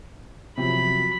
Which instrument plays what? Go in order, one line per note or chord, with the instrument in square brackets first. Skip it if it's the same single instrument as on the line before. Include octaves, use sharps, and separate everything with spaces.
[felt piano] C3 F3 F#3 [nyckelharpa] B5